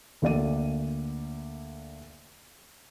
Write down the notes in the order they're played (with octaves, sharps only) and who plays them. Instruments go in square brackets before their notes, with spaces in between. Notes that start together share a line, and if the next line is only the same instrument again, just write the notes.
[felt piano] D2 A#3 D5 D#7